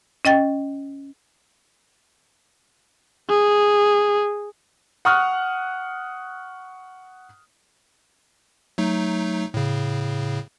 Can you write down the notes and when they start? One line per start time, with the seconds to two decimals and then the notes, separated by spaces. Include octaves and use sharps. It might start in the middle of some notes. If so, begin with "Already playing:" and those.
0.25 C#4 D#5 G5 A6
3.29 G#4
5.05 F#5 C#6 D#6 F6 F#6
8.78 F#3 A3 D#4
9.54 A2 C#3